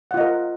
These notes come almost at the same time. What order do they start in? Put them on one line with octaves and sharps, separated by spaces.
F#5 F4 D#5 A#4